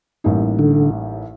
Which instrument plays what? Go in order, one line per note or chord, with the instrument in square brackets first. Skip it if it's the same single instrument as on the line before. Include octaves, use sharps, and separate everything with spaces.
[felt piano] A1 A2 G3 A#3 D#4
[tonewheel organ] D3